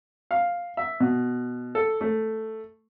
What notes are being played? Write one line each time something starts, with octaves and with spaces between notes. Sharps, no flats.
F5
E5
B2
A4
A3